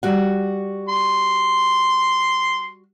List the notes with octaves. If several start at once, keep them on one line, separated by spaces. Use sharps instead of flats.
G3 F#4 F#5
C6